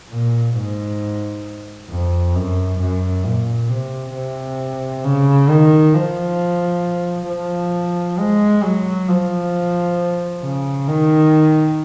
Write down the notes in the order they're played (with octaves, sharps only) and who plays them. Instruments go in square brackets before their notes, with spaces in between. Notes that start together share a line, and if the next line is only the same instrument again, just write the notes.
[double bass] A#2
G#2
F2
F#2
F#2
A#2
C3
C3
C#3
D#3
F3
F3
G#3
F#3
F3
C#3
D#3